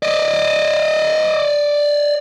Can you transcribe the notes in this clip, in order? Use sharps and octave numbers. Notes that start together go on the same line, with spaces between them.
D5 D#5